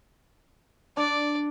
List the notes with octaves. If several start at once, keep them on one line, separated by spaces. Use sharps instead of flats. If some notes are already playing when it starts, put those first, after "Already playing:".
D4 D5